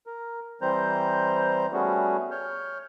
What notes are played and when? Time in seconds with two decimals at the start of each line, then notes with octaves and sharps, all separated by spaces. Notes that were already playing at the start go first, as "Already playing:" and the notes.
0.07 A#4
0.62 E3 G3 C4 C5 A#5 G6
1.73 G3 A3 B3 C#4 F#4 G#4
2.31 C#5 F6 G6